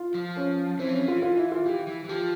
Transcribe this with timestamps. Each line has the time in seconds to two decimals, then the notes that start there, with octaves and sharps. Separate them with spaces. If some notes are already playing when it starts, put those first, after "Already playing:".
Already playing: F4
0.14 F3
0.36 C#4
0.79 E3 C4
0.89 F3 C#4
0.99 E3
1.08 F4
1.22 F4
1.37 E4
1.52 F4
1.66 E3 G4
1.87 E3
2.04 E3
2.08 F3 G4